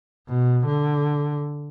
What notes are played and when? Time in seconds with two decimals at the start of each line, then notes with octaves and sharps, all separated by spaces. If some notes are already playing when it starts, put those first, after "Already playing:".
0.28 B2
0.66 D3